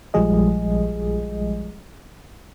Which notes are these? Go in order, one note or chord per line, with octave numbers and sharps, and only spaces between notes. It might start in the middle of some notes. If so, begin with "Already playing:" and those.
A#1 F3 G3 G#3 G#4 D#5